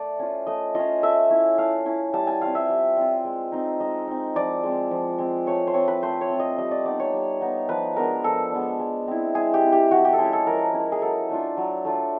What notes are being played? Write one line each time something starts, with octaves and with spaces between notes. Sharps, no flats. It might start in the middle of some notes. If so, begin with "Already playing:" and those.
Already playing: A3 D5
C#4 F4
A3 D#5
C#4 F4 D#5
A3 E5
C#4 E4
A3 F5
C#4 E4
G3 A5
G#5
C4 F4 F5
E5
G3
C4 F4
G#3
C4 D#4
G#3 D#5
C4 D#4
F3 D5
G#3 C4
F3
G#3 C4
A3 C#5
C5
C4 F4 C#5
B4
A3 C5
C#5
C4 F4
D#5
G3 D#5
D5
B3 D#4 D5
C#5
G3
B3 D#4
F3 B4
G#3 B3 D4 A#4
F3 A4
G#3 B3 D4
G#3
C4 E4
G#3 G#4
G4
C4 E4
G4
F3 F#4
G4
A4
G#3 C#4 E4 G#4
A4
F3 A#4
G#3 C#4 E4
G#4
F#3 A4
A3 D4 F4
F#3
A3 D4 F4